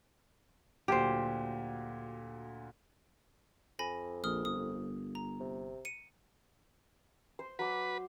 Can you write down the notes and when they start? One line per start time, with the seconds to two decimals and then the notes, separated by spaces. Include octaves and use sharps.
0.88 D2 A#2 F#3 G4 C5
3.79 F2 G#5 B5 A#6
4.24 A#1 A#4 D#6 F6
4.45 G1 D#6
5.15 A#5
5.40 C3
5.85 C#7 D#7
7.39 C5
7.59 F#3 B4 D6